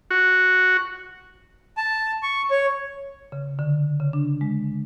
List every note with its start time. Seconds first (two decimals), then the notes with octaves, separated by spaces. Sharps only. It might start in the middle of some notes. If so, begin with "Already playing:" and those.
0.11 F#4
1.77 A5
2.23 C#6
2.51 C#5
3.32 C#3
3.59 D3
4.00 C#3
4.13 D4
4.41 G#3